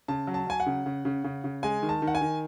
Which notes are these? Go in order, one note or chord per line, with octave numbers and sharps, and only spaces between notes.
C#3 A5
F#3
A5
F#3 G#5
F#5
C#3
C#3
C#3
C#3
C#3
G#3 G#5
D#3
A5
D#3
F#5
G#5
D#3